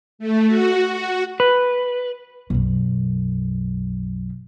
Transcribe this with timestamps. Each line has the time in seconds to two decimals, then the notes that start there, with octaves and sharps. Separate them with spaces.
0.19 A3
0.48 F#4
0.89 F#4
1.40 B4
2.50 B1 F#2